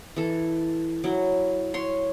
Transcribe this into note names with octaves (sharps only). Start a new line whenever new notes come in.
E3 A4
F#3 E4
C#5 C6